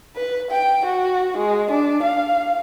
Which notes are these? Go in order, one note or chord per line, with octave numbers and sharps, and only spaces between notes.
B4
G5
F#4
G#3
D4
F5